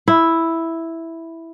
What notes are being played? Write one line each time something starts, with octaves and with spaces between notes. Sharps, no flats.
E4